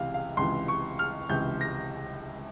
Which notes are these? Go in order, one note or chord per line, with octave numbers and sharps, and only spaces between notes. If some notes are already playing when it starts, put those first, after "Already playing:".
Already playing: C#2 C3 E3 F5
F5
C#2 C3 E3 C6
C#6
F6
C#2 C3 E3 G6
A#6